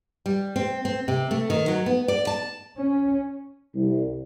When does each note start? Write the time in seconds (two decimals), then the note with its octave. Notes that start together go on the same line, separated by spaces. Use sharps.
0.26 G3
0.56 C4
0.85 C4
1.08 C3
1.31 A3
1.50 D#3
1.68 F#3
1.86 B3
2.08 D5
2.27 A5
2.76 C#4
3.75 C2